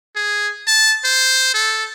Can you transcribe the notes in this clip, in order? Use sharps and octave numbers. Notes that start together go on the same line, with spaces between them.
G#4
A5
C5
A4